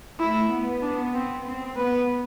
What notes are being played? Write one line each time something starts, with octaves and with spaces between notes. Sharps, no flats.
A3 E4
B3
D4
C4
C4
B3 B4